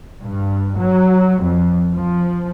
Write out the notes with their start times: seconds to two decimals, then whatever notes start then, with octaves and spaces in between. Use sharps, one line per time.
0.23 G2
0.79 F#3
1.42 F2
1.95 F3